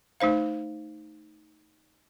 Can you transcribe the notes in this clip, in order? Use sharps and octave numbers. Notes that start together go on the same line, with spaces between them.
A3 D#4 C5 F5